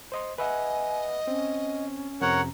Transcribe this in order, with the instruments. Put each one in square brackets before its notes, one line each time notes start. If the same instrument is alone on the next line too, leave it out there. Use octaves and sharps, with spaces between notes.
[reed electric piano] C5 D#5 C6
[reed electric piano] B4 E5 F#5 [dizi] D#5 [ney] G#5
[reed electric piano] C4 [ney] C#4
[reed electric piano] F2 C3 A#5 [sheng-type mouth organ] A#4 C#5 F#5